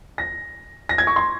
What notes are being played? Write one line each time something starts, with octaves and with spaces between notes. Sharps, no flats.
A#6
A#6
G#6
C#6
C6